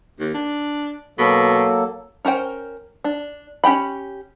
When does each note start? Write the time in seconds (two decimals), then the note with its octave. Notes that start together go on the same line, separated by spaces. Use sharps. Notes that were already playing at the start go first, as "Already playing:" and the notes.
0.20 D#2
0.34 D4
1.19 B2 F#3 A#3 A4
2.25 C#4 A#4 C5 G5
3.04 D4
3.64 C#4 G4 G5 B5